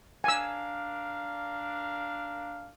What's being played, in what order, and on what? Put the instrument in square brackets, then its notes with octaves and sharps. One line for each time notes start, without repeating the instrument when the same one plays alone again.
[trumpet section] D4 A#4 F5 [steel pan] G#5 E6